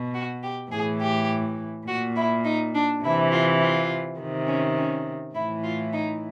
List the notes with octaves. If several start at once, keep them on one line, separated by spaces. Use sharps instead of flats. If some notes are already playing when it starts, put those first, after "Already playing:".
Already playing: B2
F#4
G4
A2 E3 G#4
G4
A#2 F#4
E4
D#4
D4
C3 E3 E4
F4
F4
C3 D#3
C#4
C#4
A2 E3 E4
F4
D#4